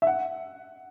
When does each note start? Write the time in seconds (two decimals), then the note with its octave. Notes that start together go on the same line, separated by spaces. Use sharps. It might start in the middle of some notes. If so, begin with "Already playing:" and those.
0.02 E5
0.07 F#5